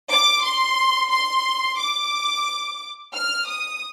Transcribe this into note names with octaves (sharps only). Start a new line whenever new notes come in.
D6
C6
C6
D6
F6
D#6